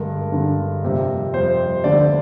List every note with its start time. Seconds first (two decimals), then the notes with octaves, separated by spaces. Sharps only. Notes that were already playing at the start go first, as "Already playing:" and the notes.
Already playing: G2 D3 G#3 A#4
0.32 G2 D3 G#3
0.83 F2 C3 G3
1.33 F2 C3 G3 C5
1.84 D2 D3 F3 D5